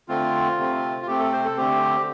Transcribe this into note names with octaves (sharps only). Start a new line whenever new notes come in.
D3 A3 C4 F4
C3 A3 C4
F4
C3 A3 C4 G4
A4
C5
A4
D3 A3 C4 G4